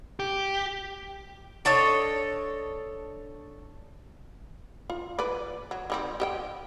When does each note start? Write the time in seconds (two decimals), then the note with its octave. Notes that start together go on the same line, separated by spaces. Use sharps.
0.20 G4
1.65 D4 A4 C#5 D#5
4.90 F4
5.19 B4 D5
5.71 F#3
5.90 D#3 G3 C4
6.20 G4 D#5 G5